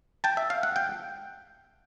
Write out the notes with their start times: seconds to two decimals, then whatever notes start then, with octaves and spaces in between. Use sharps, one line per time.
0.24 G5 A5
0.37 E5
0.50 F5
0.63 F#5
0.76 G5